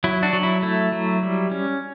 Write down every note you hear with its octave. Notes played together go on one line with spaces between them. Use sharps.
F#3 E4
D4 F#4
F#3
E4
A3 E4
F#3
G3
C#4